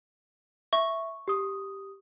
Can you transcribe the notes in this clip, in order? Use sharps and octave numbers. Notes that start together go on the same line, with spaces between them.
E5 C#6
G4 D#6